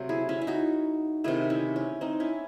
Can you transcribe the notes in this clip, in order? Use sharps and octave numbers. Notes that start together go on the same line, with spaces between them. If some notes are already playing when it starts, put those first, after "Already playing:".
Already playing: C3 F#3 A3 C5
E4 G#4
C#4 E4
E4
D#4 F#4
C3 D#3 A3 E4 G#4
C#4 E4
C#4
C4 D#4
C#4 E4